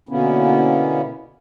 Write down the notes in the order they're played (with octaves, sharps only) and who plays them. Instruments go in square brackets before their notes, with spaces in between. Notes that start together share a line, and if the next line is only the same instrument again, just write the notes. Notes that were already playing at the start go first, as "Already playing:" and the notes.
[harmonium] B2 D3 A#3 B3 C#4 E4